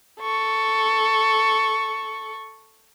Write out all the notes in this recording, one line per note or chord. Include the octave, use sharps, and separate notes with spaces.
A4 C#6